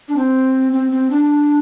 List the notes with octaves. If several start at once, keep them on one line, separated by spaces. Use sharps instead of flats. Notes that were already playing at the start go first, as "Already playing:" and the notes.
D4
C4
C4
C4
D4